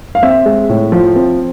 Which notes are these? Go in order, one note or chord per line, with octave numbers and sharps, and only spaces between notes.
F5
C4 E5
G#3
A2
F3
C4